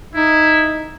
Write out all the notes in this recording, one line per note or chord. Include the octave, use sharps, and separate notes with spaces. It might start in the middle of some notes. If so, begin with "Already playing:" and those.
D#4 E4